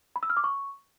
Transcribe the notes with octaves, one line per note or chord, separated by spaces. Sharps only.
B5
E6
F6
D6
C#6